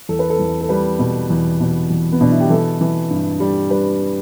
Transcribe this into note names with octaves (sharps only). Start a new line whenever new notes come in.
E2 A4
B4
A4
E2
A4
G3 B4
B2
E2
B2
E2
B3
B2 D4
E4
G4
E3 A4
E3
G2
G3
G3 B4